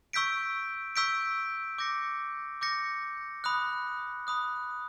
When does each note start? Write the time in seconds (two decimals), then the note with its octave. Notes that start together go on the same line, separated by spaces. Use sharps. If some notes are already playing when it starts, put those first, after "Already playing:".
0.13 C#6 E6 G6 B6 D7
0.96 C#6 E6 G6 B6 D7
1.78 D6 G6 A#6 C#7
2.61 D6 G6 A#6 C#7
3.44 B5 D#6 F#6
4.27 B5 D#6 F#6